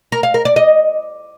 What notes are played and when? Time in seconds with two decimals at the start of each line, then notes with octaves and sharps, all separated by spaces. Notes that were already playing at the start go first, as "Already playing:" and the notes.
0.12 A#4
0.23 F5
0.34 A#4
0.45 D5
0.56 D#5